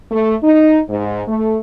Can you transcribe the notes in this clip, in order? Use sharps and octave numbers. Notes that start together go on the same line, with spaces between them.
A3
D#4
G#2
A3